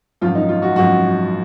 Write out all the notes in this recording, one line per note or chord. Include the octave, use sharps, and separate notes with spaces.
G#1 F#2 F3 F4
D#4
F4
F#4
G#1 F#2 F3 F#4